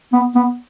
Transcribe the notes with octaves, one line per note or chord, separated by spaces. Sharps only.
B3
B3